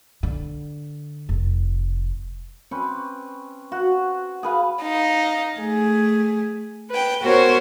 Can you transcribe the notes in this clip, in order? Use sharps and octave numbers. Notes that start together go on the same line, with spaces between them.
D3
F1
C4 C#4 B4
F#4
G#4 B4 F5
D#4 F5
A3 G#4
B4 G5
B3 F#4 A#4 C5 C#5